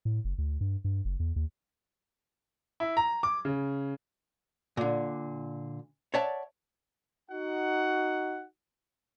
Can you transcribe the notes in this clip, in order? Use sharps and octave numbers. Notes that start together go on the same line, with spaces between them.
A2
F#1
D2
G2
G2
F#1
E2
D#2
E4
A#5
D6
C#3
A#2 D3
C#5 D5 E5 F#5 A5
D#4 F#4 F#5